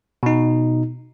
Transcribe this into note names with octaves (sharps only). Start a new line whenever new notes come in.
B2 D#4